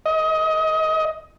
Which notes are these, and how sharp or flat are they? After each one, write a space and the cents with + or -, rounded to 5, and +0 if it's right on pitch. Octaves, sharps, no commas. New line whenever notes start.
D#5 +25